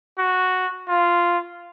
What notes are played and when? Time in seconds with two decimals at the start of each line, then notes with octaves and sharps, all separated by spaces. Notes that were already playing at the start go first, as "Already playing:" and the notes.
0.18 F#4
0.89 F4